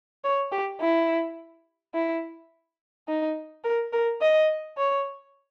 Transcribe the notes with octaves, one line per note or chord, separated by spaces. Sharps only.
C#5
G4
E4
E4
D#4
A#4
A#4
D#5
C#5